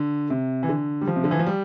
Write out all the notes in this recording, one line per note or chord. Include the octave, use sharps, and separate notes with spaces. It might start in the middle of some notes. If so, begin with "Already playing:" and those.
Already playing: D3
C3
E3
D3
G3
F3
C3
D3
E3
F3
G3